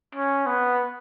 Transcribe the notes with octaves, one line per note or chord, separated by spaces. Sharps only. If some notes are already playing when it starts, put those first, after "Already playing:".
C#4
B3